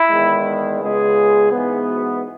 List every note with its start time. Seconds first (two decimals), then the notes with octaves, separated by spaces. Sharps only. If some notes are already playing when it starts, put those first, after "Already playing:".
Already playing: E4
0.10 E2 D#3 G#3
0.81 C#2 C#3 G#3 B3 G#4
1.52 G#2 E3 B3
1.87 F#4